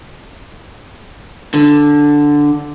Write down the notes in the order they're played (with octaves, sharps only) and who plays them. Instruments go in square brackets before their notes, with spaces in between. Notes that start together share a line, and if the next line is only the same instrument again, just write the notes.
[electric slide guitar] D3